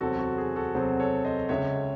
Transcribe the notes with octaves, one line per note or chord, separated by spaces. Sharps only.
E2 C3 F#3 C4 F#4 A4
F#4
G#4
F#4 A4
E2 C3 F#3 C4 G#4 C5
A4 C#5
C5 D#5
C#2 C#3 G#3 C#5 E5